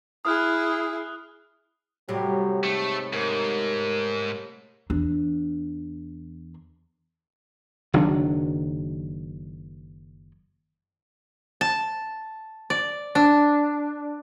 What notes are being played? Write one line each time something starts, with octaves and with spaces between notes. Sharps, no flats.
E4 G#4 D#6 F6 F#6
A2 C3 F#3 G3
G#2 A3
G#2 A#4
E2 D4
F#1 D#3 F#3 D4
A5
D5
D4